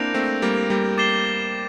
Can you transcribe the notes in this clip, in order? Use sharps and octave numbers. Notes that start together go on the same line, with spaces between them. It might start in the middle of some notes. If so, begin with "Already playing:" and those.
Already playing: A#3 C4 D4 E4 G6 A#6 D7 F7
A3 C4
G3 A#3
G3 A#3
D6 A6 C7 E7 G7